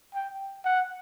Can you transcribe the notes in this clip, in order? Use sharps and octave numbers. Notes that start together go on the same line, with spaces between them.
G5
F#5